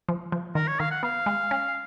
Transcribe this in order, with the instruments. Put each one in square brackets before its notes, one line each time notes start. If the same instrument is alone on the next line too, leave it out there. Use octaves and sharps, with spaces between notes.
[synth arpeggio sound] F3
F3
[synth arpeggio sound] D#3 [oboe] A#4
[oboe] C#5
[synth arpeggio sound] D#3 [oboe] F5
[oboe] F#5
[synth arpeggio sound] B3 [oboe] F5
[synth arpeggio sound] G#3
C#4